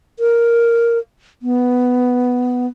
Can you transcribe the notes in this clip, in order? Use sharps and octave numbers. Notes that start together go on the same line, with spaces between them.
A#4
B3